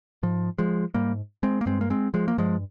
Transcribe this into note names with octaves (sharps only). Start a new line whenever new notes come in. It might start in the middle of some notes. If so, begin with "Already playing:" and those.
G#2 F3
F3 G#3
G#2 G3 A#3
G#3 C4
A#3
G2 G#3 C4
A#3
G#3 C4
F3 G#3
A#3
G2 F3 G#3